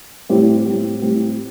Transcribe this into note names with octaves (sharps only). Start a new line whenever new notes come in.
A2 G3 C4 G4
A2 G3 C4 G4
A2 G3 C4 G4